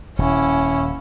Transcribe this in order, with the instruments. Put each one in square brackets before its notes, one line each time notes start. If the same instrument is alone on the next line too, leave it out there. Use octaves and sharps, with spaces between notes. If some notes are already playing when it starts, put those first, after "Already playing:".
[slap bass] D#1 [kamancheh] C#4 E4